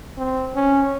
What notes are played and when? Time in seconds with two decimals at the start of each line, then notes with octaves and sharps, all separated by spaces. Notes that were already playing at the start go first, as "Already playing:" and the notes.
0.18 C4
0.55 C#4